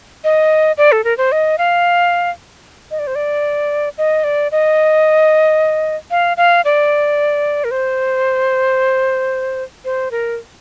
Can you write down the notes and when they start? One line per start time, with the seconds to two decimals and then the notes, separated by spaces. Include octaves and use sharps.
0.24 D#5
0.78 D5
0.92 A4
1.04 A#4
1.18 C5
1.32 D#5
1.58 F5
2.91 D#5
2.99 D5
3.07 C5
3.15 D5
3.98 D#5
4.24 D5
4.52 D#5
6.11 F5
6.37 F5
6.65 D5
7.64 A#4
7.71 C5
9.85 C5
10.11 A#4